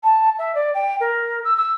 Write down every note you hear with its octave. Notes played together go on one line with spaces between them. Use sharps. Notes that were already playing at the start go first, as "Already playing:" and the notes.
A5
E5
D5
G5
A#4
E6
E6